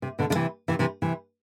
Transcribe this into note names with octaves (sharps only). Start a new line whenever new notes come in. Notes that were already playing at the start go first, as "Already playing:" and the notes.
C3
B2 D3
D3
C3 E3
C3 E3
C3 E3
C3 E3